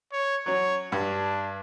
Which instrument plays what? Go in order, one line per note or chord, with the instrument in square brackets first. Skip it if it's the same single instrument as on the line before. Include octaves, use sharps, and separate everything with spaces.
[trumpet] C#5
[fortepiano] F#3 C#4 [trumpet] C#5
[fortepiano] G2 [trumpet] D4